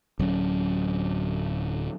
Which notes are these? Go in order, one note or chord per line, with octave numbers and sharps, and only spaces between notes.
D1 F#3 C#4